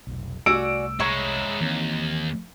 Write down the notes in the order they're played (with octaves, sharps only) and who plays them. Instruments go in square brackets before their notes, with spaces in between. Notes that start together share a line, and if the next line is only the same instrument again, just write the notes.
[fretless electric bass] F1 B1
[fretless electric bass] C2 A3 [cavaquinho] F#4 D5 G#5 [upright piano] E6 D7
[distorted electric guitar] G#3 E4 [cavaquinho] C#5 A#5 C#6
[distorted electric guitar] D#2 [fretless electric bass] E3 C4